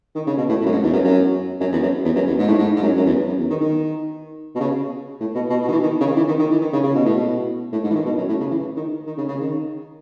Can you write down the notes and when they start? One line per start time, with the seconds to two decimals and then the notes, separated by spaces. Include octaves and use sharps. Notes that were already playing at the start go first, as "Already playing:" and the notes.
0.15 D#3
0.27 C#3
0.37 B2
0.49 A2
0.61 A2
0.65 F#2
0.72 G#2
0.83 E2
0.93 F#2
1.04 F#2
1.60 F#2
1.72 E2
1.82 F#2
2.05 E2
2.15 F#2
2.27 E2
2.38 G#2
2.47 A2
2.58 G#2
2.77 G#2
2.82 F#2
2.96 F#2
3.06 E2
3.27 F#2
3.39 E2
3.50 D#3
3.61 D#3
4.55 B2
4.60 C#3
5.20 A2
5.35 B2
5.50 B2
5.62 B2
5.68 D#3
5.72 E3
5.83 D#3
6.00 C#3
6.05 D#3
6.16 E3
6.28 D#3
6.39 D#3
6.51 E3
6.61 D#3
6.73 C#3
6.83 C#3
6.95 B2
7.05 A2
7.17 B2
7.72 A2
7.84 G#2
7.90 E3
7.95 D#3
8.05 B2
8.17 F#2
8.29 A2
8.40 C#3
8.50 E3
8.76 D#3
9.06 D#3
9.17 C#3
9.28 C#3
9.40 D#3